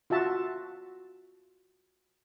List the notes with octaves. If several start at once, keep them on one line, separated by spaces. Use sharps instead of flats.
F4 F#4 E5 A5